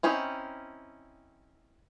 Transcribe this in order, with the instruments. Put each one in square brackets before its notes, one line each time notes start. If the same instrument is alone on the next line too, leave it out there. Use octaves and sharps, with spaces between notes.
[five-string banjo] C4 C#4 D#4 E4